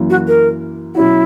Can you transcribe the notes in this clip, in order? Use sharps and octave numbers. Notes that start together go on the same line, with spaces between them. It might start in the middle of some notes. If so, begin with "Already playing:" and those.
Already playing: F#2 E3 A#3
F#4
A#4
B2 F#3 C#4 E4 F#4